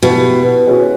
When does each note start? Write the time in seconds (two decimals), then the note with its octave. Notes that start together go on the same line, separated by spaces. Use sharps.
0.03 B2 E4 G4 B4 E5
0.67 G#3 C#4 F#4 B4